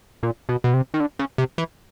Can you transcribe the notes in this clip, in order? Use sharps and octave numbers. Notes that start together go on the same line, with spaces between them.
A#2
B2
B2
C3
D#3
D3
C#3
C3
E3